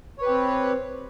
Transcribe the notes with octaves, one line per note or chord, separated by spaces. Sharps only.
C4 G4 B4 C#5